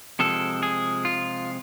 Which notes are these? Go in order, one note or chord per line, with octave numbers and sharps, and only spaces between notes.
C3 F3 G#3 A4
G#4
F4